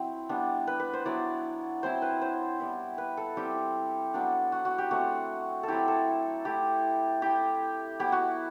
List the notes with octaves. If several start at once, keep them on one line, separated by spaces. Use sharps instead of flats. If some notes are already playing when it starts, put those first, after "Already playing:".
Already playing: F#3 C4 E4
G3 B3 D4
B4
B4
C5
F#3 B3 E4 D5
F#3 C4 E4 C5
B4
C5
G3 B3 E4
B4
A4
G3 C4 E4 G4
F#3 B3 D4
F#4
F#4
G4
F#3 A3 C4 F#4
A4
F#3 C4 E4 G4
A4
A3 E4 G4
A3 E4 G4
F#3 B3 E4 G4
F#4